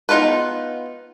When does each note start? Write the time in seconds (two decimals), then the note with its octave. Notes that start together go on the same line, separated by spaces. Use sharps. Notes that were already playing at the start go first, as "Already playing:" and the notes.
0.09 B3 D#4 F4 A4 B4